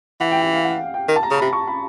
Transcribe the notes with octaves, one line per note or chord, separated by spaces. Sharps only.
E3 F#5
G5
G5
F5
F#5
G5
D#3
A5
A#5
C#3
B5
C3
C#6
B5